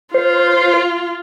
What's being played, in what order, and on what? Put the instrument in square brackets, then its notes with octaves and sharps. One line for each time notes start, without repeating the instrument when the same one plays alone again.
[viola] F4 [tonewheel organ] C5